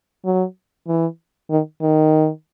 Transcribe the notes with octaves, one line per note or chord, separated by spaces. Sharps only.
F#3
E3
D#3
D#3